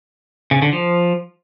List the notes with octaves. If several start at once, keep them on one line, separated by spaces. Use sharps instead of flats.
C#3
D3
F3